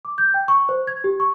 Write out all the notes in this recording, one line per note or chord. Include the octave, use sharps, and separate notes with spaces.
D6
G6
G5
C#6
C5
G#6
G4
C#6